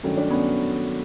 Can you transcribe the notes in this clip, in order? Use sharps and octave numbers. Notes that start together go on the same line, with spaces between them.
G2 D#3 F#3 A3 C#4
D4
B3 C#4